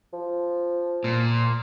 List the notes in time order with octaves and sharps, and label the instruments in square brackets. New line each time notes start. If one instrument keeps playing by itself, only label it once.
[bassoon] F3
[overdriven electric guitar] A#2